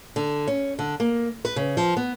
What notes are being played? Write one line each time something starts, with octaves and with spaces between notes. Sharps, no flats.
D3
C#4
D3
A#3
B4
C#3
F3
B3